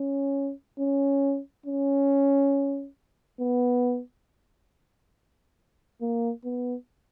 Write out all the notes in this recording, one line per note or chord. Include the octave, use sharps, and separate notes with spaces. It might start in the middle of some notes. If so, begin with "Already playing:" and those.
Already playing: C#4
C#4
C#4
B3
A#3
B3